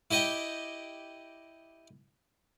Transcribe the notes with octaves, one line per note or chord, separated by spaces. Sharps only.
E4 G4 D#5 G5